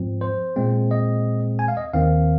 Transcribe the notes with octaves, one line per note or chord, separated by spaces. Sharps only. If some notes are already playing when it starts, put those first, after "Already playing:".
Already playing: G#2 F3 C4
C5
A#2 G#3 C4
D#5
G#5
F5
D#5
D#2 D#3 C4 F5